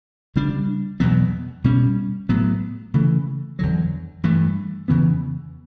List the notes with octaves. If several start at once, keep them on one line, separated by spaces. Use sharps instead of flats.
C#3 G3 D4
E2 B2 F#3 B3
B2 G3 C#4
A2 F#3 B3
C#3 E3 A3
E2 D3 F#3
G2 E3 A3
E2 C#3 E3 B3